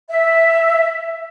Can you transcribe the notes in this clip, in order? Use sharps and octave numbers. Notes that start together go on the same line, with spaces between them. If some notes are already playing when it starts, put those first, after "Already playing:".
E5